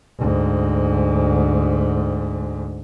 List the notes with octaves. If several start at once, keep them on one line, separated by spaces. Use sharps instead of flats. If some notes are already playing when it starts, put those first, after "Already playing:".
D2 G#2